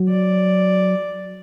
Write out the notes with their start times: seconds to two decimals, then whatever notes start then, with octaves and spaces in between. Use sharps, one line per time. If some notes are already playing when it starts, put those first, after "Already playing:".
Already playing: F#3
0.09 D5